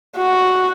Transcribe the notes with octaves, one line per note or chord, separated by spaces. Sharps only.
F#4